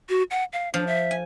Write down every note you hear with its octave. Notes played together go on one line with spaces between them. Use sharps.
F#4
F#5
F5
F3 D4
E5
G#5